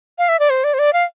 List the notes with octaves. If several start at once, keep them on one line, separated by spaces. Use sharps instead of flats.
F5
E5
D5
C5
D5
C5
D5
F5